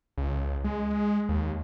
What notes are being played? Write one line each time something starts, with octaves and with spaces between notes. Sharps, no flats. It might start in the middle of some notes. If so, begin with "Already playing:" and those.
C#2
G#3
D#2